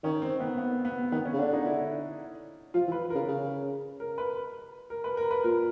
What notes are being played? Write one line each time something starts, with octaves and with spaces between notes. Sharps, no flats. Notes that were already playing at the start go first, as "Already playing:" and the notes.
D#3 C#4
C4
B3
B3
B3
D#3 B3
C#4
C#3
D3 D4
D#4
E4
F3 F4
E3
B4
C#3 A#4
C#3
A#4
B4
A#4
B4
A#4
B4
A#2 A#4